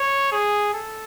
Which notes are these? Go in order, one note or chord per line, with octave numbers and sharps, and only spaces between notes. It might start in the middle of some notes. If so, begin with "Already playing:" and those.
Already playing: C#5
G#4
A4